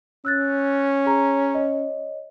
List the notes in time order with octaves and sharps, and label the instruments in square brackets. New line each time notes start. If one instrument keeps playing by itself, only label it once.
[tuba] C#4 [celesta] E6 F#6 A6
[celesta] G#4 C#5 A#5
C#5 D#5